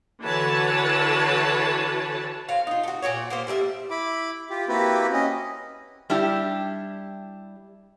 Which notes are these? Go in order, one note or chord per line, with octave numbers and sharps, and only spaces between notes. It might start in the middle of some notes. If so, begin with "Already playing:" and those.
D3 E3 F#4 B4 C#5 A5
C4 C#5 F5
D#4 F4
A3 F#4
A#2 C4 F#4 C#5
A#3 B3 E4 C5
A2 G3 G#4 E5
E4 B5 D6
F4 G4
A#3 C4 E4 F#4 G4 B4
C#4 D#5
G3 D4 E4 G4